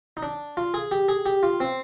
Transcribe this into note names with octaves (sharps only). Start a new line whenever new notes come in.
D#4
D4
F4
G#4
G4
G#4
G4
F4
C4